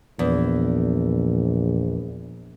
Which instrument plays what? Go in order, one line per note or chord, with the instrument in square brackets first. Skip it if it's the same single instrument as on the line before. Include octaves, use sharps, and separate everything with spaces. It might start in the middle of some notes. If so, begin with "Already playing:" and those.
[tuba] A#1 [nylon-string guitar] E2